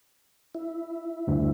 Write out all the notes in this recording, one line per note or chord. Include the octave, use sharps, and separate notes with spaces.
E4
D2 G2